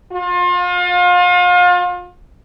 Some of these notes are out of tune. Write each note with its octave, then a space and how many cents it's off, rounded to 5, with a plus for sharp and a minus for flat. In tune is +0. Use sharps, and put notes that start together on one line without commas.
F4 +35